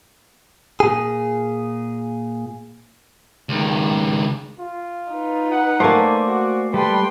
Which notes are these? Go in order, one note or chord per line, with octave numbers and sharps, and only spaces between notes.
A#2 G#4
C#2 D#3
F4
D#4 B4
F#5
A3 A#3 C5 D5 G#5
F#4
G3 A4 B4 G5 C6